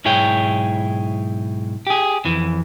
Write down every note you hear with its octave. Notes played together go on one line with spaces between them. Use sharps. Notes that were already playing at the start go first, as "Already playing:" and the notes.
B1 G#2 E4 G#4 C#5 G5
G4 G#4
F2 E3